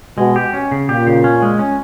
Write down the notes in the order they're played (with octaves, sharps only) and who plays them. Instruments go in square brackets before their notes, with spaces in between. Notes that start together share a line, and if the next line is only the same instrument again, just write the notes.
[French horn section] B2 [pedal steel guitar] G#3
[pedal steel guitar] G4
C#4
C#3
[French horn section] A#2 [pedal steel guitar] G4
[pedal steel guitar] C#3
C#4
G#3
C#4